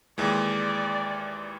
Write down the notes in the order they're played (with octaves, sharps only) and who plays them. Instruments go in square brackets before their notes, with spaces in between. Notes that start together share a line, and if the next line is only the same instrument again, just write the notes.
[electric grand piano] D#2 E3 G#3 [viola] D5